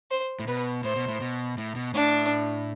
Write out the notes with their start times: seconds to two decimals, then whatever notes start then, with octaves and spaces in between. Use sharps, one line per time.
0.11 C5
0.39 A2
0.47 B2 B4
0.84 A2 C5
0.96 B2
1.08 A2
1.21 B2
1.58 A2
1.76 B2
1.94 A2 D4